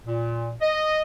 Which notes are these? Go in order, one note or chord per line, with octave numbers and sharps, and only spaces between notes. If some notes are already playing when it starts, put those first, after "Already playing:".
A#2
D#5